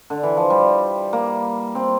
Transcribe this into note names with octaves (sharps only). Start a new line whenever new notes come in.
D3
E3
F3
G3
A#3
C4